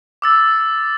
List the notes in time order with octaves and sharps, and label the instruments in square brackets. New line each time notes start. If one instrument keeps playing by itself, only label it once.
[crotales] D6 E6 A6